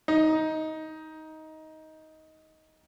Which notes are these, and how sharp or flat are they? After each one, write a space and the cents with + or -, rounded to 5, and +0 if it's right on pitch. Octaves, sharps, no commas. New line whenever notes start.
D#4 +15